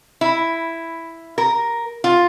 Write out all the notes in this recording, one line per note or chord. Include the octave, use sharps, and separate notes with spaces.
E4
A#4
F4